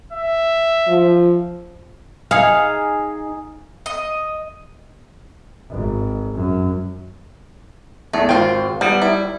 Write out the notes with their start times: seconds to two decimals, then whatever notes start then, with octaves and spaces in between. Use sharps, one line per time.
0.12 E5
0.88 F3
2.31 D#4 G#4 F5
3.86 D#5
5.70 G#1
6.35 F#2
8.13 E2 A3
8.29 G#1 C4 F4 G5
8.81 G3 B3
9.02 E4